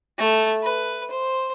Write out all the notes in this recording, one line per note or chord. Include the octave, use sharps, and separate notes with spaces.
A3
B4
C5